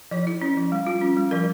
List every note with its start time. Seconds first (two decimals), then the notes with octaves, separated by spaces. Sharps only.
0.11 F3 C#5
0.27 E4
0.42 C#4
0.57 F3
0.72 G3
0.87 F4
1.01 C#4
1.17 G3
1.31 F3 A#4